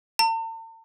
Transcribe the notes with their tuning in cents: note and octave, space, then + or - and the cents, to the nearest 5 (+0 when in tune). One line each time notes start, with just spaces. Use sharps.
A5 +45